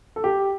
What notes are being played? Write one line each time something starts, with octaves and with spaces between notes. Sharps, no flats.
A4
G4